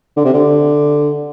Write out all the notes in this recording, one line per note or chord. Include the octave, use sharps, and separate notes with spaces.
D3
C3
D3